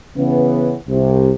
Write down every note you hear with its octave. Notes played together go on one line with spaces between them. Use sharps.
C#3 E3 B3
C2 C3